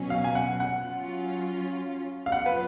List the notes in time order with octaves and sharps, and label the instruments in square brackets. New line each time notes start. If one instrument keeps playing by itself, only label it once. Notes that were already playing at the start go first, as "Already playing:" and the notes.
Already playing: [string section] B2 F#3 C#4
[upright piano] F5
G#5
F#5
F#5
[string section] F#3 C#4 F4
[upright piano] F5
[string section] F#3 B3 F4 [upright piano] F#5
[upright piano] B4